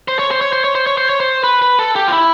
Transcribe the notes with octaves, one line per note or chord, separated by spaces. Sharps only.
C5
C#5
C5
C#5
C5
C#5
C5
C#5
C5
C#5
C5
B4
B4
A4
G4
F4
E4